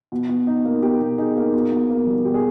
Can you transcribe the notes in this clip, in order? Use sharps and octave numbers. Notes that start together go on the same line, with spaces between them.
B2
B2
D#4
A#3
B2 G4
B2
D#4 G#4
A#3
B2
B2
A#3
G3
B2 G4
G#4